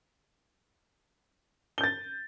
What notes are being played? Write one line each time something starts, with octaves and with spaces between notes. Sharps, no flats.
G6 A6 G7